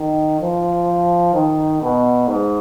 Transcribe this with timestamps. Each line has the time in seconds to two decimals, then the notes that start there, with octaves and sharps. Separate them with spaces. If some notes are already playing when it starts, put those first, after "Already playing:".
Already playing: D#3
0.41 F3
1.34 D#3
1.82 B2
2.28 G#2